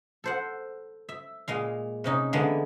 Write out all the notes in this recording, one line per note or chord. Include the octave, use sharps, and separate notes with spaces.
A4 C5 F#5
E5
A#2 G#3 F5
C3 C#4 D#4
D3 E3 G#3 A#3 B3